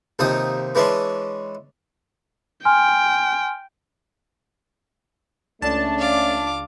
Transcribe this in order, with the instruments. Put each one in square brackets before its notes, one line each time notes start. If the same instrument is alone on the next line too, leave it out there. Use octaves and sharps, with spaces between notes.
[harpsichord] D#2 C3 F3 D#4 D#6
E3 G#3 C#4 D4 C6
[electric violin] G5 [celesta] G#5 C6 F6
[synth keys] C#2 A5 [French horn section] A3 C#4 D5 [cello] D4
[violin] F5 D6